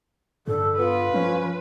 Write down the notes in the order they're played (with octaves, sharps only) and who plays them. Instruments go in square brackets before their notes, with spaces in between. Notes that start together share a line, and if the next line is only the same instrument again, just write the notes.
[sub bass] G2 [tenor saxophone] D3 [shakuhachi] A4
[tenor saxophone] B3 [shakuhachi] F4 [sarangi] B4
[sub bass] F3 [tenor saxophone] C#4